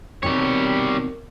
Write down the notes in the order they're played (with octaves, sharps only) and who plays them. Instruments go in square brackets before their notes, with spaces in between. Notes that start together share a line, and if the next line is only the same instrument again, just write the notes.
[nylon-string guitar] B2 D#3 C4 [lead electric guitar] G3 C#5